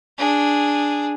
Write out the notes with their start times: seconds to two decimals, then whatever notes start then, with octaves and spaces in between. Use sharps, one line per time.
0.18 D4 G#4